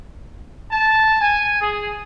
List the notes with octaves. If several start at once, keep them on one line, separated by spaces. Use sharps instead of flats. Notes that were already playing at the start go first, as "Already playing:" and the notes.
A5
G#5
G#4